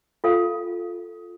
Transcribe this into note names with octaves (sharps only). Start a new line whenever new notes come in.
F4 A4 F5